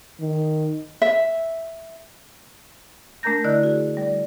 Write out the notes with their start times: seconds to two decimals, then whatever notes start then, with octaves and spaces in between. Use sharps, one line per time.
0.21 D#3
1.02 E5
3.23 A3 D4 A#4 A#5 G6 A#6
3.44 D3 E4 D5 D#5 F#6
3.63 F#4 G#4
3.97 G3 D5